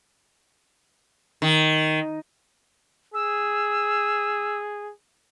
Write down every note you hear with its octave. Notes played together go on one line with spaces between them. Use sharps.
D#3
G#4 E6